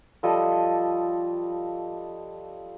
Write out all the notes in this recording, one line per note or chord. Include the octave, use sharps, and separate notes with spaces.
F3 G3 A4 D#5